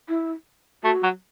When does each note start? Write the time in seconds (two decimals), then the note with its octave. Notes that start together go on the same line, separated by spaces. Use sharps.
0.09 E4
0.83 A3 F#4
1.03 F#3